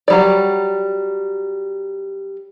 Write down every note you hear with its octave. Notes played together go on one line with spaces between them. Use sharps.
F#3 G3 D5